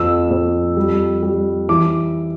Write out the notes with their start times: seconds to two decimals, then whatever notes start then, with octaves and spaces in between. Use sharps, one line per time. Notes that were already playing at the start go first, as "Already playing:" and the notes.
Already playing: F2 E6
0.30 F2
0.77 G3
1.23 G3
1.69 E3 D6